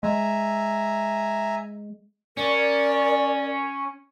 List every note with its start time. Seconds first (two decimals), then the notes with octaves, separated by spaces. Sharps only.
0.03 G#3 E5 G#5 A#5
2.37 C#4 A#4 D5